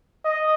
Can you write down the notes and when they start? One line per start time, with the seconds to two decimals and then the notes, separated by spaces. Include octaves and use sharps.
0.25 D#5